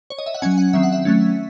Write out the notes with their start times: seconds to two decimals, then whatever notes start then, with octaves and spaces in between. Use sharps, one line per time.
0.10 C#5
0.18 D#5
0.26 E5
0.34 F#5
0.42 F#3 C#4 G#5
0.58 F#5
0.73 D#3 F#3 C4 E5
0.83 F#5
0.92 E5
1.05 F#3 A3 C#4